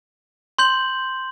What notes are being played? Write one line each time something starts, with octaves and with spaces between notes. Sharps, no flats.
C6 G6 F#7